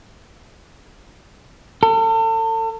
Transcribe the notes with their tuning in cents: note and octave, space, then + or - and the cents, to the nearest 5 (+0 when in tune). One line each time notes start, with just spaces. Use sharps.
A4 +40